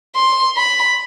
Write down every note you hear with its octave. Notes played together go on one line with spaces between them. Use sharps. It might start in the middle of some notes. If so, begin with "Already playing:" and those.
C6
B5